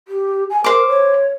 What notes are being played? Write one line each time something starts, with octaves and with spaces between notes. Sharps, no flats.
G4
G#5
A#4 C5 D6
C#5